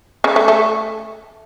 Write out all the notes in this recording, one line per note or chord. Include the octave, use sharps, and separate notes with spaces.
C#3
A3
A3